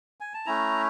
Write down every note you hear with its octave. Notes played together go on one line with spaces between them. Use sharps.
G#5
A5
A3 C#4 E4 A#5